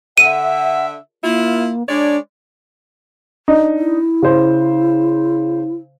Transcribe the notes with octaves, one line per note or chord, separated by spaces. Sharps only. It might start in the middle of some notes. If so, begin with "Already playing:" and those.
D3 E5 F#5 D#7
A#3 E4 F4
G#3 D4 C#5 D5
D4 D#4
E4
C#3 C5